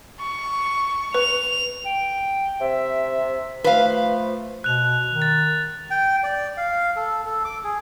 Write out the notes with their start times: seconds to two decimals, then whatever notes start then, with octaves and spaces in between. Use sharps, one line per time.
0.20 C#6
1.14 B4 F7
1.85 G5
2.61 C3 E5
3.64 F3 A3 B4 F5
4.64 B2 F#6 F7
5.09 D#3
5.22 A6
5.90 G5
6.23 D5
6.57 F5
6.96 A4
7.26 A4
7.45 D6
7.64 G#4